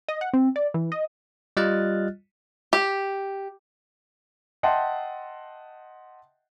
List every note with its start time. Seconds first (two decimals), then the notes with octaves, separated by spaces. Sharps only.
0.08 D#5
0.21 F#5
0.33 C4
0.56 D5
0.74 E3
0.92 D#5
1.57 G3 F4 D#5 F6 F#6 A6
2.73 G4
4.63 D#5 E5 F#5 G5 A5 C6